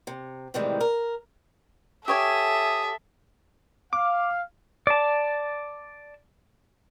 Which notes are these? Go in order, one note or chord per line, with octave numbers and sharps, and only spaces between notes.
C3
A2 C3 D#3 E3 G3 G#3
A#4
G4 A4 C#5 E5 G#5 D#6
F5 D6
D5 A5